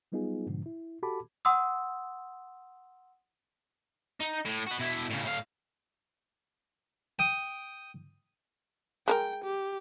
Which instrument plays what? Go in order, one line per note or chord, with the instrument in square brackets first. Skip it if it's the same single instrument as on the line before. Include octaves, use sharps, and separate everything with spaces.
[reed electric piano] F#3 G3 B3 D#4 F4 G#4
G#2 B2 D3 F3
E4
F#4 G4 A4 A5 B5 D6
[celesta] F#5 C6 D#6 E6
[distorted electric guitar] D#4
A2
F#4 B4
B2 E4
A2 C#3
A2 F5
[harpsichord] G5 D#6
[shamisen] G#3 G#4 A#4 [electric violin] G5
[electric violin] G4